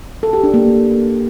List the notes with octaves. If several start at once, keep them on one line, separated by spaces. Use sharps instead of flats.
A4
G4
D4
A#3